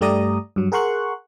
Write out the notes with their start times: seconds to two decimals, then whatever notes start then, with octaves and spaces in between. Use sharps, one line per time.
0.01 G2 A3 G4 D5 A#5 D#6
0.56 G2 F#3
0.72 G#4 A#4 F#5 C6 C#6 F#6